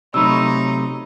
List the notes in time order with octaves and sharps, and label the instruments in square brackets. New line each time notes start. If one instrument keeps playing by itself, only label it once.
[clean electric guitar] C3 F#3 A3 [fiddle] D#4 [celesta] B5 E6